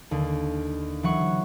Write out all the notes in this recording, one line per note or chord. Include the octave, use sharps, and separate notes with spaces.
D#2 D3
E3 F#3 F#5 C#6